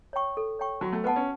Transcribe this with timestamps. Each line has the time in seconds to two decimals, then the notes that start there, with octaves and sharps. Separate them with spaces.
0.13 C#5 G5 C#6
0.37 A4
0.59 C#5 G5 C#6
0.81 F#3 F#4
0.93 A3
1.04 B3 B4 F#5 A5
1.16 C#4